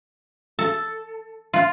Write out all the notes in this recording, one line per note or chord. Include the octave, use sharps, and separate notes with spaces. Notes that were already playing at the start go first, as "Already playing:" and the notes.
A4
F4